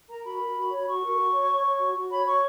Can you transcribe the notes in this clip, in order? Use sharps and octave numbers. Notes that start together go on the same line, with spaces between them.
A#4 A#5
F#4 B5
A#4
F#4
C#5
B5
F#4 C#6
A#4
F#4
C#5
C#5
C#5
F#4
F#4
C#5 B5
C#5 C#6